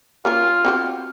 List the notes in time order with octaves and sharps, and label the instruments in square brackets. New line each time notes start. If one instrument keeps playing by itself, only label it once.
[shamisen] A#3 C#4 A#4 [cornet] F4 [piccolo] F6
[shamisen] C4 F#4 G4